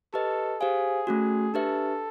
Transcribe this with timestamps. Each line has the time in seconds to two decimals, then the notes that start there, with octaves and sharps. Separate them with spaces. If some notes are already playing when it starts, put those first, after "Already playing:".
0.14 G4 A4 B4 D#5
0.60 G4 G#4 C5 F5 G#5
1.07 A3 C#4 F#4
1.54 D4 G4 A4 B4 E5